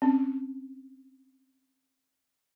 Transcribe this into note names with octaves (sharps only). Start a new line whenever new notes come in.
C4 C#4